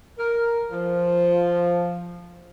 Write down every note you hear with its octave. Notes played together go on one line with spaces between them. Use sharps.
A#4
F3